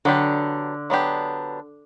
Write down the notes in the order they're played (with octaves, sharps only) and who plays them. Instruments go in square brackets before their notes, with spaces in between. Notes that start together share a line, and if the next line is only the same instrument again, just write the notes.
[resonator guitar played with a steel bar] D3 [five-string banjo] F#3 B3 D4 G4
[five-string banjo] F#3 B3 D4 G4